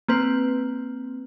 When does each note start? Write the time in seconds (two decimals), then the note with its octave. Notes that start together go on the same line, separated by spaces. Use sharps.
0.08 A#3 C4 B4